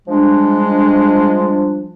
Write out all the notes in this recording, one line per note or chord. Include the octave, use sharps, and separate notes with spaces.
F3 G3 G#3 D4